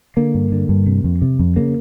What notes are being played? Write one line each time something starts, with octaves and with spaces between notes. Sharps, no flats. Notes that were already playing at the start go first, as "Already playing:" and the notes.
D3 A#3
G2
D3
G2
C3
F2
C3
F2
C#3 A#3